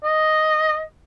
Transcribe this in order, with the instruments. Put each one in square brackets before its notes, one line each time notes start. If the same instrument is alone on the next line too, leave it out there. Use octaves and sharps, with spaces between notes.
[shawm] D#5